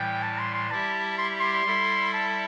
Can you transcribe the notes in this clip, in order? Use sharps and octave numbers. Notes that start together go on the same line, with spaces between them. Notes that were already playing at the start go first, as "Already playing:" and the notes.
Already playing: A2 E3 G3 G5
A5
C6
C6
G3 E4 G4 E5 A5
C6
C6
G3 E4 A4 E5
A5